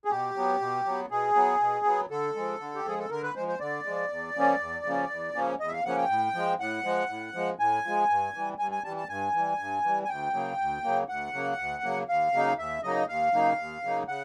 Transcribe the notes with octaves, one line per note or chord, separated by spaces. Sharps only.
G#4
B2 G4
F#3 B3
B2
F#3 B3
B2 G#4
F#3 B3
B2
F#3 B3
D3 A4
F3 G#3
D3
G4
F3 G#3 G#4
A4
D3 A#4
B4
F3 G#3 C5
C5
D3 D5
F3 G#3
E2
C#3 F3 A#3 C#4
E2
C#3 F3 A#3 C#4
E2
C#3 F3 A#3 C#4
E2 D#5
E5
F5
C#3 F3 A#3 C#4 F#5
G5
A2
F3 G#3
A2 F#5
F3 G#3
A2
F3 G#3
A2 G#5
F3 G#3
G2
E3 G3
G2 G#5
G#5
E3 G3 A5
A5
G2 G#5
E3 G3
G2
E3 G3
G#5
D2 G5
C#3 F#3 A#3
D2
C#3 F#3 A#3
D2 F#5
C#3 F#3 A#3
D2
C#3 F#3 A#3
D#2 F5
C#3 F#3 A#3 D#4
D#2 E5
C#3 F#3 A#3 D#4 D#5
D#2 F5
C#3 F#3 A#3 D#4
D#2
C#3 F#3 A#3 D#4
C#3 F#5